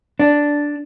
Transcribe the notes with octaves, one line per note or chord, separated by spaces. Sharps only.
D4